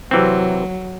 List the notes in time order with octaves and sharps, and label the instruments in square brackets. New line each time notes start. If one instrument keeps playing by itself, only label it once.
[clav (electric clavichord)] C3 E3 C4 [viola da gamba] F#3